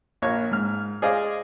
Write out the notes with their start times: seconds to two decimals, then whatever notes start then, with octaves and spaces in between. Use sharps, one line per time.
0.22 A#1 A#3 C#5
0.51 G#2 F6
1.02 G#4 C5 D5 D#5 F5 G#5